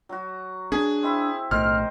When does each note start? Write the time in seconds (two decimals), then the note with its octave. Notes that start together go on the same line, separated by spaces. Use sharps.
0.09 F#3 F#4
0.72 C#4 D4 G#4
1.03 C4 E4 E5
1.51 B1 A2 A#4 C5 D#5 F6